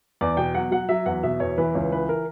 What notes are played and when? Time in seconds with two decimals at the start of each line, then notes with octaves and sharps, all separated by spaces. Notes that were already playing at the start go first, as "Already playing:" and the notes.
0.21 E2 D5
0.37 B2 G5
0.55 F#3 F#5
0.71 F#3 F#5
0.89 F#3 E5
1.06 E2 F#5
1.23 B2 E5
1.40 E2 C#5
1.58 E3 B4
1.75 C#2 C#5
1.92 E3 B4
2.09 A#4